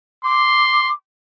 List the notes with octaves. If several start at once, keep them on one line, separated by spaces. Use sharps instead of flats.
C6 D6